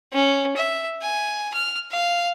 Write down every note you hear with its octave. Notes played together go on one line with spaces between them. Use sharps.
C#4
E5
G#5
F6
F5